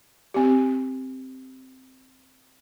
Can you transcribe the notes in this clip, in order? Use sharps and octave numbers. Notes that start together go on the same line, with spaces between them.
C4 G4